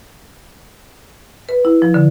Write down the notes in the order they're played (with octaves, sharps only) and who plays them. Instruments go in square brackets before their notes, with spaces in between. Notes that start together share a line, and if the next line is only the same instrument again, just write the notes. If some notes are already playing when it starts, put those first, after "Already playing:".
[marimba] B4
E4
F3
D3